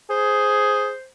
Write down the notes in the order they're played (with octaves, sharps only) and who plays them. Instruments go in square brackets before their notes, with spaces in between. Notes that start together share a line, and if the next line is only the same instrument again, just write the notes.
[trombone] G#4 [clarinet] C5